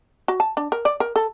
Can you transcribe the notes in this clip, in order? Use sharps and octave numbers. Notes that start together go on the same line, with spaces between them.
F#4
A5
D4
A#4
D5
A#4
A4